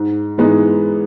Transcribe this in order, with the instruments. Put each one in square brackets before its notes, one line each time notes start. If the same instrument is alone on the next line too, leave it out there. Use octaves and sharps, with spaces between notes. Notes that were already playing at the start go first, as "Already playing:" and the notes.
Already playing: [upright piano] G#2
E3 G#3 B3 D#4